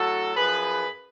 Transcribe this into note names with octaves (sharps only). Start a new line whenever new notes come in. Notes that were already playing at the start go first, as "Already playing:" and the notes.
Already playing: A2 F#3 F#4 A4
F#2 F3 G#4 B4